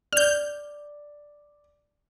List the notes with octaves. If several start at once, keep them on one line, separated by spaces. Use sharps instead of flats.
D5 F6 G6